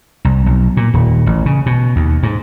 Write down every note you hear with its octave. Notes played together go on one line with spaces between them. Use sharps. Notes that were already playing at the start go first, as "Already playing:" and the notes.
C2
B1
A#2
D#1
A1
C#3
B2
D#2
G#2